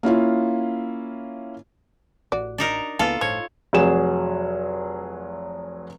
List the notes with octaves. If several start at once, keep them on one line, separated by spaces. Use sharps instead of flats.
A#3 C#4 E4 F4
A1 F#4 D5
D4 D#4 A#4
C#2 E3 A#3 B3 F4 A4 A5
G1 A2 F3 C#5
F1 F#3 G#4 E7